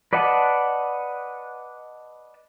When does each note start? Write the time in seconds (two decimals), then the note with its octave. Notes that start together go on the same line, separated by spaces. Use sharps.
0.13 B4 D5 D#5 F#5 A5